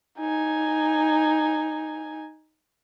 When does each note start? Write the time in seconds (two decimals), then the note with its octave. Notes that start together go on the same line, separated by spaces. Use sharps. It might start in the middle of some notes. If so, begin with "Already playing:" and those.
0.19 D#4 G#5